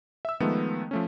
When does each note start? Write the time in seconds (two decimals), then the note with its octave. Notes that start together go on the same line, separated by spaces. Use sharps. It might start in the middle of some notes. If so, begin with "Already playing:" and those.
0.25 E5 E6
0.40 D#3 F3 G#3 A3 B3
0.91 F3 A3 C#4